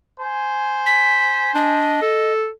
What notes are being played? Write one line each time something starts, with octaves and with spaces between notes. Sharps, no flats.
C5 G#5
B6
D4 D#5
A4